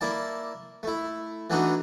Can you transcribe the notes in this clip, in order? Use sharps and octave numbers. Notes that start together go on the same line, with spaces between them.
A#3 E4 D5 A5
A3 E4
E3 A3 B3 D4 D#4 F#4